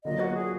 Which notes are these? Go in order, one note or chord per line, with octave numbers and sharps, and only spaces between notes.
D3 F#3 A#3 F4 D#5
F#4
G#4